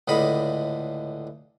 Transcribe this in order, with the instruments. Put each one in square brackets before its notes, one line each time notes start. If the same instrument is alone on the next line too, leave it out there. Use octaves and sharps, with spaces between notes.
[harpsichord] C#2 A2 D3 D#5 B5